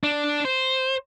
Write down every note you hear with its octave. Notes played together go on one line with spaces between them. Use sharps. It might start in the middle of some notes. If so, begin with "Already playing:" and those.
D4
C5